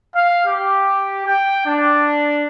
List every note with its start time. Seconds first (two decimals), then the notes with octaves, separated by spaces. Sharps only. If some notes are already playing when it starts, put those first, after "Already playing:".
0.15 F5
0.46 G4
1.26 G5
1.65 D4